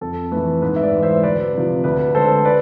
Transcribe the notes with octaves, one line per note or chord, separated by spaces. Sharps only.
F2 A4
E3 A3 B4
G#2 B4
E5
B4 D5
E3 G#3
C5 E5
D2 B4 D5
C3 F3
D2 B4
D3 G#3 A4 C5
B4 D5